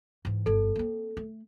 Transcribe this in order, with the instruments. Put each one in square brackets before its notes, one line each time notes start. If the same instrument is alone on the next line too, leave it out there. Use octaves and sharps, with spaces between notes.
[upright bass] G#2 E3
[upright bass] G1 F2 [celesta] A4
[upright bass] A#3 C4
A3